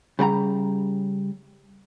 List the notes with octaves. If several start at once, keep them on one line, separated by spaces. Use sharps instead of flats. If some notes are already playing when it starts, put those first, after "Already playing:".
C#3 G3 F#5 A#5